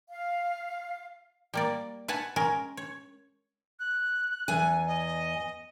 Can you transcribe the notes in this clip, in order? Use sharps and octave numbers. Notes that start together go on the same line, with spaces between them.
F5
G3 A#3 D5
B4 F#5 G#5 A5
G#3 C#4 A#4
C#5
F#6
E2 G#5
D#5